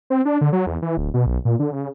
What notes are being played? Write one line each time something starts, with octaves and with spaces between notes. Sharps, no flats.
C4
D4
D3
F#3
E2
E3
D1
B2
B1
A#2
D3
C#3